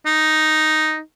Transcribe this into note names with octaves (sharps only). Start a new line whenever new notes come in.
D#4